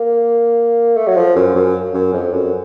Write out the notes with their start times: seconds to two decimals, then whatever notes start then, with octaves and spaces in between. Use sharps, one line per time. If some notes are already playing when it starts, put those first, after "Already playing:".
Already playing: A#3
0.97 A3
1.08 F#3
1.17 F3
1.36 F#2
1.55 F#2
1.94 F#2
2.13 F2
2.33 F#2